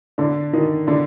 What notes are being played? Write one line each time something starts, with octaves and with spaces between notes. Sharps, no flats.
D3 D4
D#3 D#4
D3 D4